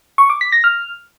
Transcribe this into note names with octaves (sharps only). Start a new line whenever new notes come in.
C#6
D6
B6
A#6
F6